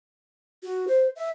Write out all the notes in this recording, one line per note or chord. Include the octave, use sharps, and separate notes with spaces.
F#4
C5
E5